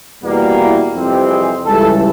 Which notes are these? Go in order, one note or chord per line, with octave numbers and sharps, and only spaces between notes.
E2 B2 G3 A#3
E4
F2 C3 E3 G3 C4
G#4
C#2 C#3 E3 G3 A4